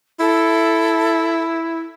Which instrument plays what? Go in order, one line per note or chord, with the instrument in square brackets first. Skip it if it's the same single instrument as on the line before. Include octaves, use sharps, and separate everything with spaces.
[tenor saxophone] E4 [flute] A4